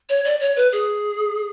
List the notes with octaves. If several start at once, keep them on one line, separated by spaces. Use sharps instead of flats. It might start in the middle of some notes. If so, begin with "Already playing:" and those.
C#5
D5
C#5
B4
G#4